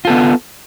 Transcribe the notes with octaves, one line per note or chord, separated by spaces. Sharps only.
B3 F4 A4